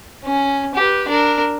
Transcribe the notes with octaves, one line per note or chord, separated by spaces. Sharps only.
C#4
G4 B4
D4 A#4